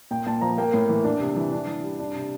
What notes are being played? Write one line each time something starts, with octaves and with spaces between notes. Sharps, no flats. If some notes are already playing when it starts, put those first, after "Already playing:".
A#2 G5
A#2 A5
F3 A#5
A#3 G5
A2
E3
D4
C3
E3
D4
E3
G3
D4
C3